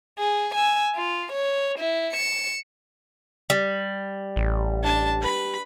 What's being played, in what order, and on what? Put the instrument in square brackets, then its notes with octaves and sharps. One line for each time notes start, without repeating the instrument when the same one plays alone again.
[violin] G#4
G#5 E6
F4
C#5
E4
C#7 E7
[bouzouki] G3
[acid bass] A1
[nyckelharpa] D4 A5
B4 B5